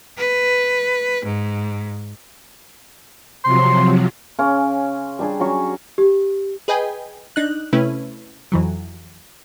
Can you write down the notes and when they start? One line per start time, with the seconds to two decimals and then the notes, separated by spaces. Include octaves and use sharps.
0.17 B4
1.25 G#2
3.45 C3 F3 F#3 C6
4.39 C#3 C#4 C6 D6
5.19 G3 D4 G#4
5.40 F#3 C#4 C#6
5.98 G4
6.68 G#4 B4 D#5 G5 G#5
7.36 D4 D#4 F#6
7.73 C3 A3 C#4 E4 B4
8.52 F2 E3 F#3